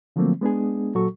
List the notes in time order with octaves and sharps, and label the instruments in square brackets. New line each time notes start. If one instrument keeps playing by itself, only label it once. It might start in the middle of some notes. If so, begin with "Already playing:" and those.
[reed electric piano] D3 F3 F#3 A3 A#3 C4
G#3 B3 D4 G#4
A#2 F#3 F#4 A4 C#6